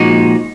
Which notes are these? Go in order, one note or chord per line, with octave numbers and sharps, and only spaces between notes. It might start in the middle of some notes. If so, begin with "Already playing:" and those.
Already playing: A#2 F3 G#3 D#4 F#4